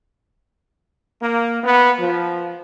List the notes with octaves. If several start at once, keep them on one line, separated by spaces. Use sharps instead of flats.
A#3
B3
F3